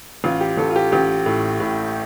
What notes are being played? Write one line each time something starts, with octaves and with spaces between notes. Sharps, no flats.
A1 F4
G4
A1 A4
F4
G4
A1 G4
A2
A2